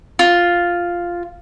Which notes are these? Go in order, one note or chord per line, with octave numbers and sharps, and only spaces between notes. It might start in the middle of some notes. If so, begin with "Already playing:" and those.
F4